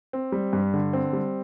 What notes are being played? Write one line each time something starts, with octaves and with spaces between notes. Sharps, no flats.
C4
G3
G2
D3
C4
G3